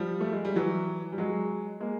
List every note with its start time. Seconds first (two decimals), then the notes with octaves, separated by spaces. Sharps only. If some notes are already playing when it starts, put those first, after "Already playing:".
Already playing: F3 G3
0.21 A3
0.32 G#3
0.45 G3
0.56 E3 F#3
1.12 G3
1.18 F#3 G#3
1.80 G#3 A#3